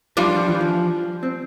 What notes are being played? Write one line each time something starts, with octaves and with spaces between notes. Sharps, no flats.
F3 G3 D4 F4
F3
E3
F3
C4